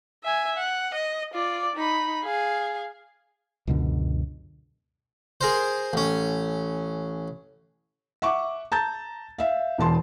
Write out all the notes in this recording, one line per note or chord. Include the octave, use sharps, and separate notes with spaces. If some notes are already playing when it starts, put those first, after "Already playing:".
E5 G#5
F#5
D#5
F4 D5
D#4 B5
G#4 F5
C#2 F#2 B2 D3
G#4 A#4 C5
A1 C#4
E5 F#5 C#6 D6
A5 A#5 G6 A6
E5 F5
E1 E2 A5 C6